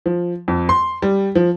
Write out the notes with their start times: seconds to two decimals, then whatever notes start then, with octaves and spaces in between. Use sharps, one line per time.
0.06 F3
0.48 F2
0.69 C6
1.02 G3
1.35 F3